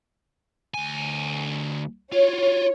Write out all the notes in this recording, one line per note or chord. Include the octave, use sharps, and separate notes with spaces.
D2 G#5
F4 F#4 C#5